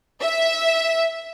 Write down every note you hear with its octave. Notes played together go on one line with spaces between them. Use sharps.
E5